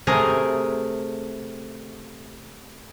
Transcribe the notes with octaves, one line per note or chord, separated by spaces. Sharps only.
C3 A3 G#4 A#4